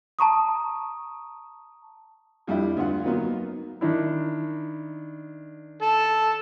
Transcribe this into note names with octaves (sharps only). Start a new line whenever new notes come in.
A5 A#5 C#6 D#6
F2 G3 D4 E4
D2 G2 F4 F#5
F#3 A#3 B3 D#4 F4
D#3 D4 E4
A4